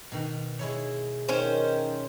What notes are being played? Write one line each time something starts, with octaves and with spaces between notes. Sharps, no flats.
B2 D#3
G#3 E4 C#5
D#3 C#4 C5